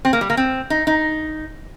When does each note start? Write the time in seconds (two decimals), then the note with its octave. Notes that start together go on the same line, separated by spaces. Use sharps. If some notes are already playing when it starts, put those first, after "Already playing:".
0.05 C4
0.13 A#3
0.21 G3
0.30 A#3
0.37 C4
0.70 D#4
0.87 D#4